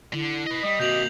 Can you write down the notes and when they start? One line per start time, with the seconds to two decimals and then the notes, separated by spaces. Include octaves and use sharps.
0.13 D3 E4
0.47 B4 D#5
0.63 G3 D#5
0.80 C3 A#3 F#4 G6 F7 F#7